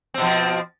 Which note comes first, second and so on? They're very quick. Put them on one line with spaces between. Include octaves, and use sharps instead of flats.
C4 B2 F3